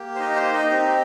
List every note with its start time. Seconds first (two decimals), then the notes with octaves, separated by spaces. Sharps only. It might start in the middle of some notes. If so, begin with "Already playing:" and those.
Already playing: A#3 G4
0.15 C5
0.19 D#4 D#5
0.36 C5
0.53 D#4 D#5
0.71 C4 D#4 G4